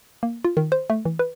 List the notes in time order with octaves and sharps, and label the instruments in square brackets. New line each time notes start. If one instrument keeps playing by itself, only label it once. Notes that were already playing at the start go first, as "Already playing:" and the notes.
[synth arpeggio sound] A#3
F4
D#3
C5
A3
E3
B4